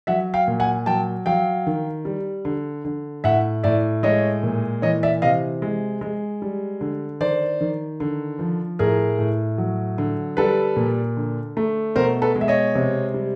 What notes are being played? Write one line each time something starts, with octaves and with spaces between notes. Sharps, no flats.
F#3 E5 F#5
F5 G5
A#2
F#5 G#5
F#3 G5 A5
F#3 F5 G5
D#3
G3
D3
D3
A2 E5 F#5
A2 D5 E5
G#3 C#5 D#5
A#2
E3 C#5 D#5
D5 E5
C3 D#5 F5
G#3
G#3
G3
D3
D#3 C5 D5
D#3
D3
F3
A2 G#4 A#4
A2
F#3
D3
G3 A4 B4
A#2
D3
A3
B2 A#4 C5
A4 B4
G#3
E5
C#5 D#5
C3
G3